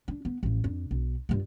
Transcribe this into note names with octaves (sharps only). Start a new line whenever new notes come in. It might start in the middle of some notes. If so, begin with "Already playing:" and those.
D4
B3
A1 F3
F2 D4
B1
G2 F4